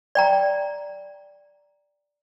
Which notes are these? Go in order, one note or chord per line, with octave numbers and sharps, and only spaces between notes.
D5 G5 A#5